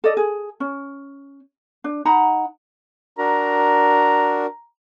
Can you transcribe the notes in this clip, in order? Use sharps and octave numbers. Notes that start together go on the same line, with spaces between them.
A4 D5 D#5
G#4
C#4
D4
D#4 F#5 A#5 B5
D4 F#4 A#4 A#5